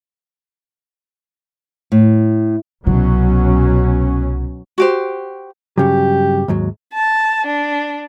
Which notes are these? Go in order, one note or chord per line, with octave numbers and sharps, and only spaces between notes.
A2
C2 B2 F#3 C#4
F#4 G4 C5
G2 C#3 F#3 G4
D#2 G#2 F#3
A5
D4